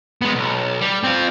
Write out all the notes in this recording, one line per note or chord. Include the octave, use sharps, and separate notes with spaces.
G#3 B3
B1
G3
C4 F4